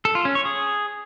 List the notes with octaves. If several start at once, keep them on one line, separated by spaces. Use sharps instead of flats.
A4
F4
C#4
C#5
G#4